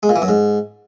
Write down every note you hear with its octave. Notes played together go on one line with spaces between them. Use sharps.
G#3
A#2
E3
F#2
G#2